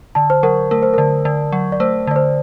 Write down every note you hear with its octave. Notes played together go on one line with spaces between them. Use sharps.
D3 A5
C5
F#3 A#4
A3 A#4
C5
D3 A#4
D3
F#3
D5
A3 C5
D3 D5
C5